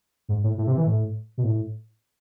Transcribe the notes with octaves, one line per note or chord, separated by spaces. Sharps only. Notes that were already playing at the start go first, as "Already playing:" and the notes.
G#2
A2
A2
C3
E3
A2
B2
A2